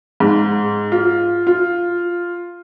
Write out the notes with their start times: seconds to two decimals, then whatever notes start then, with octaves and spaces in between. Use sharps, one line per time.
0.20 G#2
0.92 F4
1.47 F4